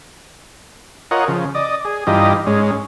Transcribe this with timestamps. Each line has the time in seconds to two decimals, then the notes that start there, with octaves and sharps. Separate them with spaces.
1.11 F4 A#4 C#5 D#5 F#5
1.28 C#3 F3
1.55 D5 D#5
1.85 G#4
2.07 G2 E3 D#4 F4 G4 D#5
2.47 G#2 G#3 C#4